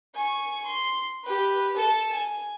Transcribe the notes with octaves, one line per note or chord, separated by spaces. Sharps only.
G#5 C#6
C6
G4 B4
A4 A5
G#5